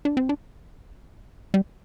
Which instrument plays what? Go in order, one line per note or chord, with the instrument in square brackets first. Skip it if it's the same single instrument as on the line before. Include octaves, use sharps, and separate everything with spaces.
[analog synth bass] D4
C4
D4
G3